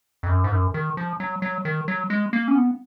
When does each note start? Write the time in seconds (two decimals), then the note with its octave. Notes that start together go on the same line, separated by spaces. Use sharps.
0.23 F2
0.29 F#2
0.44 G#2
0.52 F#2
0.74 D#3
0.97 F3
1.20 F#3
1.42 F#3
1.65 D#3
1.88 F#3
2.10 G#3
2.33 A#3
2.48 C#4
2.55 B3